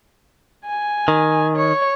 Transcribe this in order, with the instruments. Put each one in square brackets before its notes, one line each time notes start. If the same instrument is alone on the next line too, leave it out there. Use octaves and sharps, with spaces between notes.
[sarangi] G#5
[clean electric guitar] D#3
[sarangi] C#5